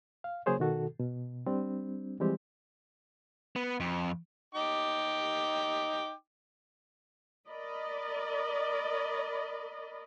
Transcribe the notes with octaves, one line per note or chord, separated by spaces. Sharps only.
F5
C#3 F#3 A#3 G#4 C5 C#5
B2 D#3 F#4 A4
B2
G3 C4 D4
E3 F3 G3 G#3 C4 G4
B3
F2
D#4 G5 D6
A#4 D5 D#5 B5